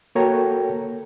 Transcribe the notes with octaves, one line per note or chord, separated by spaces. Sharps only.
A#3 F#4 A4 C#5 G5 A#5